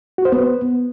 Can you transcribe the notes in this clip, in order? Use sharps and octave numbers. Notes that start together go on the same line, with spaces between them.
F#4
C5
B3